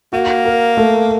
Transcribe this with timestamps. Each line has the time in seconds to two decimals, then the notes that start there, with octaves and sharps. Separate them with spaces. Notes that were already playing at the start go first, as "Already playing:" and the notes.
0.13 A#3 F#4
0.45 A#4
0.77 A3